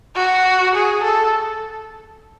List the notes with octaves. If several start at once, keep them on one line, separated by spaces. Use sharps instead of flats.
F#4
G#4
A4